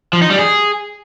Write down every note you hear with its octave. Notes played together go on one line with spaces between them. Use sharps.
F3
D#4
G3
G#4